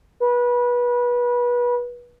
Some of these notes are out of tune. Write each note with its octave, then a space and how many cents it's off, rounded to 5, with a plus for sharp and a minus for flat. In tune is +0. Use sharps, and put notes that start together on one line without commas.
B4 -25